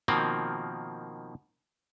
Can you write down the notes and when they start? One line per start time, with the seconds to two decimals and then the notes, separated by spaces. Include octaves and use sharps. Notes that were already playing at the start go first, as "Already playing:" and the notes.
0.08 B2 D#3 F3 A#3 C4